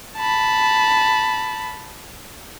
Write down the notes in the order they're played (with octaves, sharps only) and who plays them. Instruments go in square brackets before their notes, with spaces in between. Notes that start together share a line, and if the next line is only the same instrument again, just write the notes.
[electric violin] A5 B5